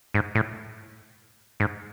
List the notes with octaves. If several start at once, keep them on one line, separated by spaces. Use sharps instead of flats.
G#2
A2
G#2